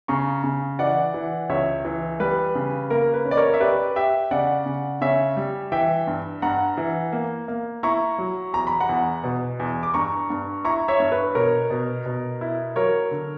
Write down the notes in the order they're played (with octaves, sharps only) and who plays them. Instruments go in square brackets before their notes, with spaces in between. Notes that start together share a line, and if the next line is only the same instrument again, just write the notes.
[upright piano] C#3 [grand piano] A#5 C#6
[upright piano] C#3
[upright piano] E3 [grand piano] D5 F#5
[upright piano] E3
[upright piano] C#2 [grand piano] C#5 E5
[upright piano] E3
[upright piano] G3 [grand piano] B4
[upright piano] C#3
[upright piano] A#3 [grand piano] A#4
[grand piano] B4
[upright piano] C#4
[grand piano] D5
A#4 C#5
E5
[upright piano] G4 [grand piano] B4 D5
[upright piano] G4 [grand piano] E5 G5
[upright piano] C#3 [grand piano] D5 F#5
[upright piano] C#3
[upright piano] C#3 [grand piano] C#5 E5
[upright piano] G3
[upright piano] E3 [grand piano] E5 G5
[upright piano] G2
[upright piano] G2 [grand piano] F#5 A#5
[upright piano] E3
A#3
A#3
[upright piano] E4 [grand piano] A#5 C#6
[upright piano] F#3
[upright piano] E2 [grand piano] A#5
[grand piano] B5
F#5 A#5
[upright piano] E2
B2
E2
[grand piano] D6
[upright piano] G2 [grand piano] A#5 C#6
[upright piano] G2
[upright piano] E4 [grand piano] A#5 C#6
[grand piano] C#5 E5
[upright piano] G2
[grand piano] B4
[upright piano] B2 [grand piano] A#4 C#5
[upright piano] B2
B2
E4
[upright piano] F#3 [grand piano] A#4 C#5
[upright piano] D3